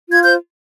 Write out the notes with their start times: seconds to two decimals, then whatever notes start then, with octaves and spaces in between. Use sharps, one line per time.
0.08 F4 G#6
0.23 C5 G6